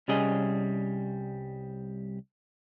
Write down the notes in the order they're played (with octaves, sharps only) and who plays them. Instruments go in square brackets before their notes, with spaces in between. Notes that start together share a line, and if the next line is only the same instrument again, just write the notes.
[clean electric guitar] C2 G3 C#4 G#4 D#5